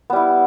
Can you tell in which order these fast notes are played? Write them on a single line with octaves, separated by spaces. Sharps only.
B3 G3 E4